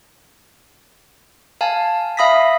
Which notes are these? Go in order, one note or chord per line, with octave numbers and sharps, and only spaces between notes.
F5 G#5 A5
E5 F5 B5 D#6 A#6 B6